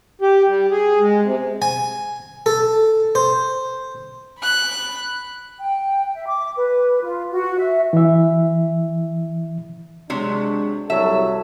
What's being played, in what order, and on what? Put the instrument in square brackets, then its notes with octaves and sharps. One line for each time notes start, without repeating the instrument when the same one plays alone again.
[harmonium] G4
G3
G#4
G#3
C3
[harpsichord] G#5
A4
C5
[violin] B5 F#6
[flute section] G5
E5
D6
B4
F4
F#4
E5
[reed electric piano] E3 E5
[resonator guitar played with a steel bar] C3 F#3 [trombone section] G#3 D4
[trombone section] C2 F#3 A4 [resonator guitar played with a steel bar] E5